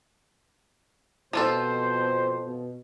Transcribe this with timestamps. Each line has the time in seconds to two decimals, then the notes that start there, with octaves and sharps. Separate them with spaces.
1.33 F2 B2 F3 F4 A4 C5
2.44 B2